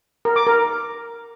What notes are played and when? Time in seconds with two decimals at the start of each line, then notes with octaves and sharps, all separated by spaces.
0.25 A#4
0.36 D6
0.47 A#4